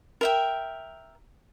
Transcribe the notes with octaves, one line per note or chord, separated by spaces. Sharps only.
A#4 E5 G5